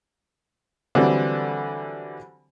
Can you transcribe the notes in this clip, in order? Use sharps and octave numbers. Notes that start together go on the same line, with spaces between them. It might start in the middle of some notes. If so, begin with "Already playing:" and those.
D3 E3 F#3 G3 C4 D4